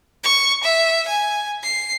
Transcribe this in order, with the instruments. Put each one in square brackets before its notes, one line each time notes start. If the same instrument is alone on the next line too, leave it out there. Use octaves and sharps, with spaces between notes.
[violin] C#6
E5
G#5
C7